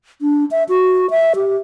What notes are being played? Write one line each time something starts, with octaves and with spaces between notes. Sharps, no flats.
D4
E5
F#4
E5
G4